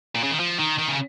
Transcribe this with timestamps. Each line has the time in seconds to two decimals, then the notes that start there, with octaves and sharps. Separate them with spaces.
0.15 A#2
0.23 C#3
0.31 D#3
0.40 F3
0.59 D#3
0.78 D#3
0.88 C#3